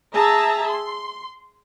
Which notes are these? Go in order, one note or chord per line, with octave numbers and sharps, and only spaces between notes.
G#4 E5 A5 A#5
C6